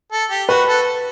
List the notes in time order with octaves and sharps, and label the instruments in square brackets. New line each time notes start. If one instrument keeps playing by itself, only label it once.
[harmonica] A4
G4
[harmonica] F#4 [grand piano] B4
[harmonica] A4